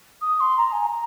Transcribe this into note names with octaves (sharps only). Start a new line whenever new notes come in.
D#6
C6
A#5
G#5
A#5